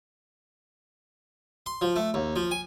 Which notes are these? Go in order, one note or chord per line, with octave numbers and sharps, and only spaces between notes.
C6
F3
A3
D#2
F3
G#5